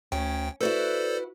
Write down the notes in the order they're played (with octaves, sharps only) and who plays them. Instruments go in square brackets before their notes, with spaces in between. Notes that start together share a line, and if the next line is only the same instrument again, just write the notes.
[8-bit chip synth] D2 G5 [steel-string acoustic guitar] C#4
[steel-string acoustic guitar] E4 F#4 B4 [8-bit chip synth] A4 C5 D5